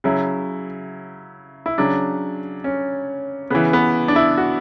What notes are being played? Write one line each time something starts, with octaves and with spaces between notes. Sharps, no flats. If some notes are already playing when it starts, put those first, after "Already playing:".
C#3 F#3 E4
E4
C#3 F#3 D4
C#4
C#3 E3 B3
B3
D4
E4
F#4